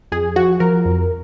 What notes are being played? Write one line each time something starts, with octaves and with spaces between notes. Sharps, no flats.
F2 G#4
F3 F#4
F3 A#4
F2